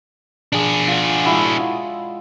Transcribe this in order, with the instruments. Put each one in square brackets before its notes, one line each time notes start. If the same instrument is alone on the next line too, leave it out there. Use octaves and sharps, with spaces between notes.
[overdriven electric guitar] D4 G#4
[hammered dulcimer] F4 D5 F#5
G#3 E4 F#4
F4